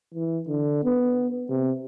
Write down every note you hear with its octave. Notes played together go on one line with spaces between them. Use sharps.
E3
D3
B3
C3